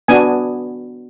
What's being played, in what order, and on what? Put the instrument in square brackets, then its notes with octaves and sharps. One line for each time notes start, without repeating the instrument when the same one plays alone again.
[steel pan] B3 D4 F#4 G#5